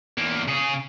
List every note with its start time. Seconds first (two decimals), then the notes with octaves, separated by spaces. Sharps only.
0.18 E2 A#3
0.49 C#3 G#4